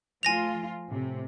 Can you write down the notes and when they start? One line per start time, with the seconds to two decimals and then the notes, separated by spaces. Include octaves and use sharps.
0.23 F3 A3 F4 G#5 A#6 F7
0.89 A2 C3